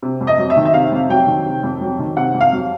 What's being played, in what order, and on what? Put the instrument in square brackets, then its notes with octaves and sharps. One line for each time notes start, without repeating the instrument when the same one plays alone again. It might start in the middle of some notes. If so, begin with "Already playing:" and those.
[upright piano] C3
F2
D#5
F#3
E5
D#3
E5
C3 F5
F2
F#3 G5
D#3
C3
F2
F#3
D#3
C3 F#5
F2
F5
F#3